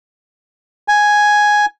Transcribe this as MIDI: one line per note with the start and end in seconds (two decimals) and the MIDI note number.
0.88 1.66 80